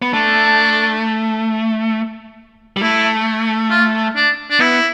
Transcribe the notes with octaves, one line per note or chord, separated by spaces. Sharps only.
B3
A3 D4
G3
A3 E4
F4
D4
D4
B3 E4